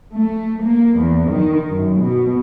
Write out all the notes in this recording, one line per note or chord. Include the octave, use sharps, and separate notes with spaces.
A3
A#3
E2
D#3
F#2
B2